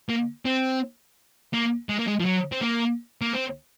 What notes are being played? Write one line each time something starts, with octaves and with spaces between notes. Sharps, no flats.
A#3
C4
A#3
G#3
A#3
G#3
F3
F#3
C4
A#3
A#3
C4